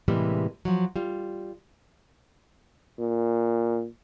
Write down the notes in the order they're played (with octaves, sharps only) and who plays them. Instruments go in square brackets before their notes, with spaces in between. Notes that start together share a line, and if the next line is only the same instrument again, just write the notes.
[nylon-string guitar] A2 C3 E3 G3 G#3 A#3
F3 F#3
G3 F4
[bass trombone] A#2